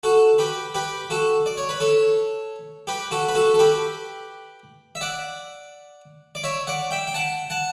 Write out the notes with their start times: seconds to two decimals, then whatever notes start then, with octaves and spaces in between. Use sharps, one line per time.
0.03 F#4 A4
0.38 G4 B4
0.75 G4 B4
1.10 F#4 A4
1.46 D5
1.57 C#5
1.69 B4
1.80 A4 C#5
2.87 G4 B4
3.11 F#4 A4
3.28 B4
3.35 F#4 A4
3.54 A4
3.59 G4 B4
4.95 E5
5.01 D5 F#5
6.35 D5
6.44 C#5 E5
6.67 D5 F#5
6.91 E5 G5
7.07 G5
7.14 F#5 A5
7.50 F#5 A5